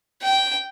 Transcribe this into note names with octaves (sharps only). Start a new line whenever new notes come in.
G5